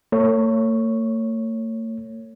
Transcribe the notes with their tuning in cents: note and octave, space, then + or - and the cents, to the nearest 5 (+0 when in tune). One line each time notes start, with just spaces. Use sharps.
A3 +45 C#5 +0